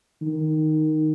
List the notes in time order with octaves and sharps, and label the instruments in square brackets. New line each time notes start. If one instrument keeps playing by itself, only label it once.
[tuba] D#3